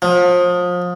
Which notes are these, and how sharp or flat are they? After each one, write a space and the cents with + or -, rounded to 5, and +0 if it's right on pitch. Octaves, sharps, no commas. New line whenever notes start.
F3 +30